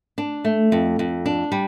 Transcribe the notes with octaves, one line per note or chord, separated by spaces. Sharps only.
D4
A3
F2
F2
D4
G3